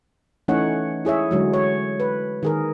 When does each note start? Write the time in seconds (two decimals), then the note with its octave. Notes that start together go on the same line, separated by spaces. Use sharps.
0.48 E3 A3 C#4 D#4 C#5 F#5
1.05 E4 G#4 C#5 E5
1.31 D3 F#3 G#3
1.53 C#5
2.00 B4
2.43 D#3 G#4 A#4